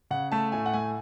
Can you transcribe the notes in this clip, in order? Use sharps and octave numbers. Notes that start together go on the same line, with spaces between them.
C#3 F#5
A3 A5
A2 G#5
F#5
A3 G#5